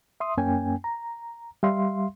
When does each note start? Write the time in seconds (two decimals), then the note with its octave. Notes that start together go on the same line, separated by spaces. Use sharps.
0.20 E5 C6 D#6
0.37 F#2 A#3 C#4 G5 G#5
0.84 A#5
1.63 G3 E5 F5 C6